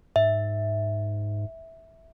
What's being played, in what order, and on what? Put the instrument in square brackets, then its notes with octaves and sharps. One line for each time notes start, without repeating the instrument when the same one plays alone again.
[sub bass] G#2 [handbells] E5